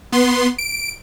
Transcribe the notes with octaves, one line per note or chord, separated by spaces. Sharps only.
B3 C6
D7